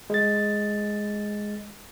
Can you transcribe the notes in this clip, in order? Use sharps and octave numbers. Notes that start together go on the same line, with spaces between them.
G#3 A6